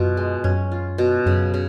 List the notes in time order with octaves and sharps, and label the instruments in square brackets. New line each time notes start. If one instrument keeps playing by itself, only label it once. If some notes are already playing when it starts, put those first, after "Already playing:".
Already playing: [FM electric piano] F#2 [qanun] B2 F4
[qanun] G#3
[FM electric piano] F#2 [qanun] C#4
[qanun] F4
B2
[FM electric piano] F#2 [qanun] C#3
[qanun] C#3